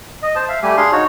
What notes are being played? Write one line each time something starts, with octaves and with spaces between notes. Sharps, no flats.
D#5
C5 A5
E5 F5
G3 A3 G4 G#5
D4 G#4 F5 C6
D#4 F#4 C#5